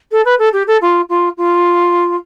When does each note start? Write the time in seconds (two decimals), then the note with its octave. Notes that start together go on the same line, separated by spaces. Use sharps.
0.11 A4
0.25 B4
0.38 A4
0.52 G4
0.67 A4
0.81 F4
1.09 F4
1.37 F4